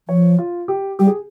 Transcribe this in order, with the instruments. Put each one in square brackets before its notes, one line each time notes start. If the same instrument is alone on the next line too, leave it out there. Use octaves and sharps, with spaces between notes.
[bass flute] F3 [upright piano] C#5
[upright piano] F4
G4
[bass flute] G3 [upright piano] G4
[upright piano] G#4